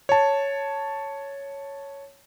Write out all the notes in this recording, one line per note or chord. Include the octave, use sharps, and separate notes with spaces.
C#5 A5